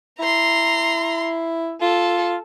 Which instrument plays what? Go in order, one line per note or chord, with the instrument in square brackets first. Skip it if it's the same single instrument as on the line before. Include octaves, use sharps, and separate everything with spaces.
[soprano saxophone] E4 [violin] A#5 C6
[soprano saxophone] F4 [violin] A4